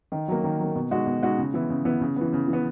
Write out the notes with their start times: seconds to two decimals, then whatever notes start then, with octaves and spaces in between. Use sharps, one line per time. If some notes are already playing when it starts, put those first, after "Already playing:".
0.12 D#3
0.28 F#3 A#3
0.44 D#3
0.59 F#3 A#3
0.75 B2
0.91 G#3 D#4 F#4
1.06 B2
1.23 G#3 D#4 F#4
1.38 C#3
1.54 E3 B3 E4
1.69 C#3
1.85 E3 B3 E4
2.01 C#3
2.16 E3 B3
2.33 C#3
2.48 E3
2.53 B3